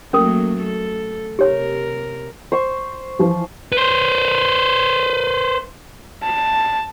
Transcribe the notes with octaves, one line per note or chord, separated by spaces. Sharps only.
F#3 A3 A#3 C#4 A#4 D#6
A4
C3 G4 A#4 C#5
C5 C#6
E3 F3
B4 C5
A5